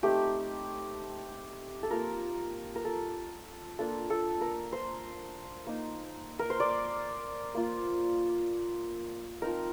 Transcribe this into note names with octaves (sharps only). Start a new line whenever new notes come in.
A3 C4 D#4 G4
A4
A#3 F4 A#4
A#4
A4
A#3 D4 F4 A4
A4
A#4
C5
A#3 D#4
A#4
C5
D5
A#3 F4
F3 C4 D#4 A#4